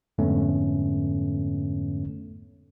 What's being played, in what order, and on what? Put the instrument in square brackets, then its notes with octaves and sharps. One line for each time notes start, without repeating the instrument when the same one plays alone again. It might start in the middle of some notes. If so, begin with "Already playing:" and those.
[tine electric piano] F2 G#2 D3 A3 B3 C#4